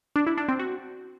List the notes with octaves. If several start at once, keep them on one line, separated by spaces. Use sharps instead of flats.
D4
E4
D4
C4
F#4